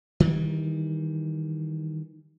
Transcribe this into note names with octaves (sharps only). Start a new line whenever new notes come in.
D#3 E3 G3